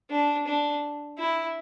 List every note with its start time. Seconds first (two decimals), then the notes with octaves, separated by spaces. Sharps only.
0.10 D4
0.47 D4
1.19 E4